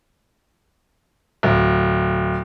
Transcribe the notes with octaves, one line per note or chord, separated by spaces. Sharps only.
D1